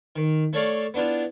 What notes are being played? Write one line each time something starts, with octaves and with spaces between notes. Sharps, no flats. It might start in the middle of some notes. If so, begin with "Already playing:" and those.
D#3
A3 A4 C#5 D5 F5
B3 D4 E4 F4